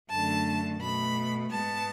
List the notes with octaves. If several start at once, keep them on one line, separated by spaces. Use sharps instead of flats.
F#2 D3 A3 A5
B2 A3 B5
G#2 G#3 B3 A5